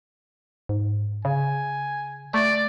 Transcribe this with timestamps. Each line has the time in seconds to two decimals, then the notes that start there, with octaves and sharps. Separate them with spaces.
0.69 G#2
1.25 C#3 G#5
2.34 A3 D5